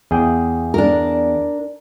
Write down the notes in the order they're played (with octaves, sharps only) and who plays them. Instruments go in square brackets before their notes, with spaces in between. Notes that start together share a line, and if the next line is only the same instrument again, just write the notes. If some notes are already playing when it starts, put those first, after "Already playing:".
[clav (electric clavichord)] E2 G#4 G5
[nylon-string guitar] D4 A#4